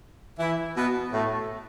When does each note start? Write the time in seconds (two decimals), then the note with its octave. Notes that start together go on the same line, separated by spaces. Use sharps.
0.39 E3 E4
0.76 B2 B3
1.12 A2 A3